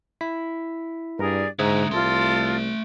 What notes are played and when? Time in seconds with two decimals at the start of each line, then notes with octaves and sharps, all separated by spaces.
0.21 E4 B6
1.19 G2 G#4 A#4 D5
1.59 G#2 D3 G#3 E5 A#5 D#6 G#6
1.91 C2 A3 F4 A4 C6